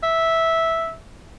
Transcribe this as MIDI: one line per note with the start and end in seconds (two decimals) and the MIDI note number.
0.03 0.94 76